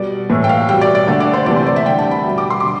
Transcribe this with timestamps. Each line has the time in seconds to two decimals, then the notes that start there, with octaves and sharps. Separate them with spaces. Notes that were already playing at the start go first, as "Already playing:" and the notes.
Already playing: B2 G3 D5
0.30 A2 E3 A3
0.44 G5
0.49 F5
0.69 B2 G3 G5
0.81 D5
0.95 D5
1.07 D3 A3
1.20 D5
1.33 C5
1.46 C3 E3 A3 D5
1.56 C5
1.66 D5
1.76 E5
1.86 D3 G3 G5
1.99 A5
2.11 B5
2.24 B2 G3
2.38 D6
2.50 C6
2.60 D3 D6